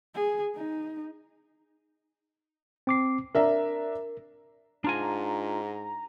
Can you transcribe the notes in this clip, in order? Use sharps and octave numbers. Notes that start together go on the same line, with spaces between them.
G#4
D#4
C4 D6 C7
D4 A#4 E5 A#5
G#2 D4 F4 G#5 A#5